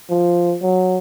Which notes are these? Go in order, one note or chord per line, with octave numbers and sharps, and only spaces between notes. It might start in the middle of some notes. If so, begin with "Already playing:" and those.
F3
F#3